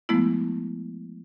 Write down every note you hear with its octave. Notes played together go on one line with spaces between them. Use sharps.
F3 G#3 A3 B3 E4